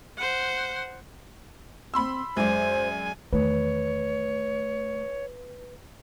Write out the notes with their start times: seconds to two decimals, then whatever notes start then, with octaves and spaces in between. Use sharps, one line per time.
0.18 C5 F#5
1.94 C4 B5 C6 E6
2.37 F#2 G#3 C5 D5 G#5
3.33 E2 D#3 A3 B4 C#5